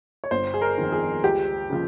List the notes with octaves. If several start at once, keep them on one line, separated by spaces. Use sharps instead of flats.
C#5
G1 C5
G#4
A#4
F2 D#3
G#4
C#2 G4
C#3 F3